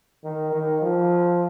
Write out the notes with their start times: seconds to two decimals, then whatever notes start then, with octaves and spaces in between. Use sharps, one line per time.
0.24 D#3
0.52 D#3
0.82 F3